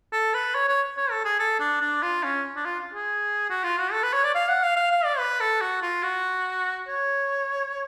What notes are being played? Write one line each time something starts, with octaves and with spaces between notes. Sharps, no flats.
A4
B4
C#5
C#5
C#5
A4
G#4
A4
D4
D4
F4
C#4
D4
F4
G#4
F#4
F4
F#4
A4
B4
C#5
D5
F5
F#5
F5
F5
F5
D5
B4
A4
F#4
F4
F#4
C#5